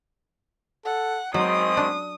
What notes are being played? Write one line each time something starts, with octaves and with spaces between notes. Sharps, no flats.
A4 F#5
G#2 F#3 C4 D#5 D#6
D4